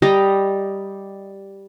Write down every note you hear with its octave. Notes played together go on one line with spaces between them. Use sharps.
G3 G4 D#5 A#5